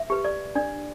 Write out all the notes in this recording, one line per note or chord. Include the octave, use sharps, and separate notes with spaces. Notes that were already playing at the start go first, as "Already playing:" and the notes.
Already playing: E5
G4 B4
D5
D4 D5